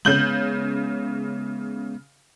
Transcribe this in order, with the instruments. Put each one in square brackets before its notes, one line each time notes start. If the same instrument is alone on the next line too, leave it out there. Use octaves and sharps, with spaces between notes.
[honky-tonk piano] C#3 G6 F#7 [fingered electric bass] G#3 B3